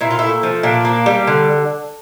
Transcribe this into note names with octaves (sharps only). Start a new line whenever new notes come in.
A#2 E4
F4
A3 E4
F3
A#2 D4
A#3
G3
D3